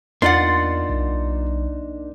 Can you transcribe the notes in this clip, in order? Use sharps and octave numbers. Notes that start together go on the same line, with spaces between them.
E2 A#3 D4 D#4 F4 D5 F#5 C6
B1